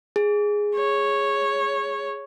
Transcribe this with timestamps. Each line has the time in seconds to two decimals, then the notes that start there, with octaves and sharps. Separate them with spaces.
0.16 G#4
0.76 C#5